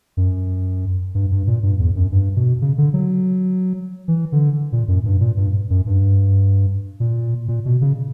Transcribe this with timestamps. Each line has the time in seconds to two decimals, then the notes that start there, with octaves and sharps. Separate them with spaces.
0.17 F#2
1.15 G2
1.31 G2
1.47 A#2
1.63 G2
1.80 E2
1.96 F#2
2.12 G2
2.36 B2
2.62 C#3
2.78 D3
2.93 F#3
4.08 E3
4.32 D3
4.72 A#2
4.88 F#2
5.05 G2
5.21 A#2
5.37 G2
5.70 F#2
5.87 G2
7.00 A#2
7.48 A#2
7.65 B2
7.81 C#3